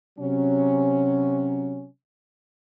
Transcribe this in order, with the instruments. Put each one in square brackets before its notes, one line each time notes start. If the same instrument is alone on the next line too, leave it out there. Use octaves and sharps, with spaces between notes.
[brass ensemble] C3 F#3 C#4